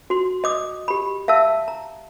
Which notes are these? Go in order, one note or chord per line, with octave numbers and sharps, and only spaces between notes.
F#4 C6
D#5 D6 D#6
G4 B5
E5 F5 A5 E6
A#5